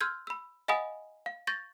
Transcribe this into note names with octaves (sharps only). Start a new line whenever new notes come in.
C6 E6 F6 G6 G#6
B5 E6
D#5 F5 F#5 G#5 B5 D#6
F5
C#6 G6 A6 A#6